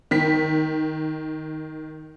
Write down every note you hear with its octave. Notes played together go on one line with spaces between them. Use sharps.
D#3 B6